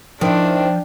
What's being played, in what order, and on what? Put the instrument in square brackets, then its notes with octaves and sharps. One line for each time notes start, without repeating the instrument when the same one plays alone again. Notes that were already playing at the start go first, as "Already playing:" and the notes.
[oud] D#3 E4 [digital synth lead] F3 [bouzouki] C4 [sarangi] D4